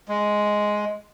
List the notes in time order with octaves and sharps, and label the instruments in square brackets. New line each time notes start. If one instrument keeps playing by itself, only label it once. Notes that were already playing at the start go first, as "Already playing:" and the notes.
[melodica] G#3